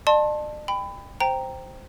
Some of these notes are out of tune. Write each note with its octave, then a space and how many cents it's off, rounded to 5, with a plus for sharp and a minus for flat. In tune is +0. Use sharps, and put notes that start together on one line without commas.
D5 +45 A5 +0 C6 +35
G5 +25 B5 +25
C5 +0 G5 +0 A#5 +0